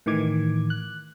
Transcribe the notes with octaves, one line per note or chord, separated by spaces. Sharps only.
A2 D#3 E3 D6 G#6
F#6